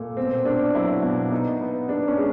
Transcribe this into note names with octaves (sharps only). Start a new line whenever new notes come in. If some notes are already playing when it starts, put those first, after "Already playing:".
Already playing: A#2 A3
B2 C4
A#3 D4
F#3 E4
B2
B3 D#4
B3
B3 D4
C#4
G#3